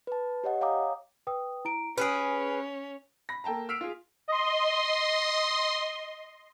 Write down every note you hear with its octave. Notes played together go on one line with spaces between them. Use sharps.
B4 A5
G4 C#5 D#5 F#5
C#5 F5 G5 A#5 D6 D#6
B4 G5 D#6
E4 A#5 D7
C#4 G#4 A4 B4 F6 F#6 D7
B5 A#6
A#3 A4 G5 A5 A#5
E6 F6 B6 C7 D7 F7
F4 G#4
D#5 C6